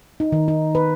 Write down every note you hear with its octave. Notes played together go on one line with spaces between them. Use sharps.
D#4
D#3
D#4
B4